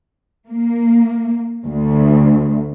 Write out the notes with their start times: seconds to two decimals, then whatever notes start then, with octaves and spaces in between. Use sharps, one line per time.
0.48 A#3
1.65 D2